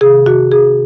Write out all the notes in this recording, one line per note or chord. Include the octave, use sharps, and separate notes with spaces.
C3 D#3 G#4
F#4
G#4